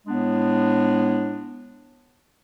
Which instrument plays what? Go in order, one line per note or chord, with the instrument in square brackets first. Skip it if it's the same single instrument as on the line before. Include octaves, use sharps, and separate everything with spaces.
[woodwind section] A2 G#3 B3 D4